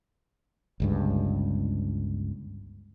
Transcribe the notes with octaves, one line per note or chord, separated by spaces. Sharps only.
G1 C#2 G2